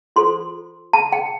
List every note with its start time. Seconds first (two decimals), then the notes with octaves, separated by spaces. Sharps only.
0.16 F4 A4 C5 C6
0.93 A5
1.12 G5